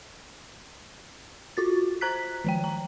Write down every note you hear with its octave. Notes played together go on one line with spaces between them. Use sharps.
F4 F#4 A6
C5 A#5 F#6 B6
D#3 F3 G5
A#5